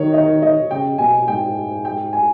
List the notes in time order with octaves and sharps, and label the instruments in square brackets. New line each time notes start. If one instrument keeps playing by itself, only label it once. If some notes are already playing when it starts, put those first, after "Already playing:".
Already playing: [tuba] D#3 [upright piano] C#5
[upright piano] D#5
D#5
[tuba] C#3 [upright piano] G5
[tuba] B2 [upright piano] G#5
[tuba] G#2 [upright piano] G5
[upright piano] G5
G#5